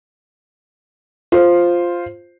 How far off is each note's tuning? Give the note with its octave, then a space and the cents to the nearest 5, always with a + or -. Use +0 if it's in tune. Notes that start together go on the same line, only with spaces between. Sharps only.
F4 +0 C5 +0